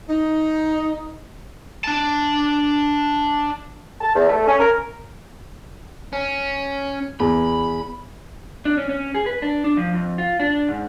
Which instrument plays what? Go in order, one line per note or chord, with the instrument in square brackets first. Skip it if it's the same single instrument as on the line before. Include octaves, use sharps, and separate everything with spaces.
[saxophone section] D#4
[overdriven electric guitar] D4 A5
[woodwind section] A5
E2
A3
C#4
A#4
[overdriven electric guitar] C#4
[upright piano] E2 [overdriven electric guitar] B5
[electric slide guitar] D4
C#4
C#4
G#4
B4
D4
D4
F3
F2
F4
D4
G#2